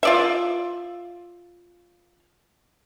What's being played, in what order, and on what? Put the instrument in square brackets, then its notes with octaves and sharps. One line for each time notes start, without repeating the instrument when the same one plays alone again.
[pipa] F4 D5 E5